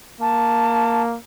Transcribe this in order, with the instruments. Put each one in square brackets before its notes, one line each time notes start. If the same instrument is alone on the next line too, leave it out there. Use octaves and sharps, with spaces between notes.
[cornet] A#3 [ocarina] A5